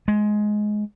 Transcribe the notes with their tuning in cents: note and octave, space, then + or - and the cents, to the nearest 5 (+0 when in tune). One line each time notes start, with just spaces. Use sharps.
G#3 +15